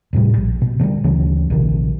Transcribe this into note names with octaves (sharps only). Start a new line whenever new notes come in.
D#1 A2 C3 G3
A#1
B2
B2 D3 E3 G3
D2 C#3 E3 F#3
A#1 C3 D#3